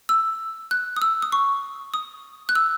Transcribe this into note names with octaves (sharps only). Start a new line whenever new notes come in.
E6
F#6
D#6
E6
D#6
C#6
D#6
F#6
E6